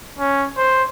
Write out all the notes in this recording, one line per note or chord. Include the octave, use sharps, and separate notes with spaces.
C#4
C5